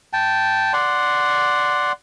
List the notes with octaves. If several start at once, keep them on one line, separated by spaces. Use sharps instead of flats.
G5 A5
D5 F#5 C6